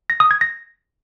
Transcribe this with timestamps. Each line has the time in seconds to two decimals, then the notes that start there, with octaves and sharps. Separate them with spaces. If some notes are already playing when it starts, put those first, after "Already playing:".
0.10 A#6
0.20 D#6
0.31 G#6
0.41 A#6